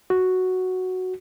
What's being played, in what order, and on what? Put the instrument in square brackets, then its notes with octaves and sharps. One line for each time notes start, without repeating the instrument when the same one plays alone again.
[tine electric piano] F#4